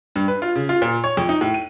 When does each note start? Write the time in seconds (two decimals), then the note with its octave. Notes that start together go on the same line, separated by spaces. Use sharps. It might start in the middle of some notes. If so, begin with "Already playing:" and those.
0.16 G2
0.28 B4
0.42 F4
0.56 C#3
0.69 F4
0.82 A#2
1.04 C#5
1.17 F2
1.29 D#4
1.41 A2
1.54 D#7